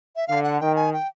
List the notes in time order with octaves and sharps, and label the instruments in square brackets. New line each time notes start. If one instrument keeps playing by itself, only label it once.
[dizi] E5
[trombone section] D3 [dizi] F5
[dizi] F#5
[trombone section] D#3 [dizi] G5
[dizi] G#5
G5